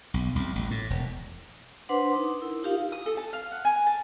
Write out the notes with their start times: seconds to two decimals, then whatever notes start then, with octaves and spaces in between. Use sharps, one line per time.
0.14 B1
0.36 C2
0.55 A1
0.71 A2
0.90 E1
1.89 D4 B4 C5 F#5 C6 D6
2.15 D#4
2.42 E4 A#4
2.63 D#4 F4 G4 A#4 F5
2.92 D#6
3.06 A4
3.17 A5
3.33 F5
3.52 F#5
3.65 G#5
3.87 A5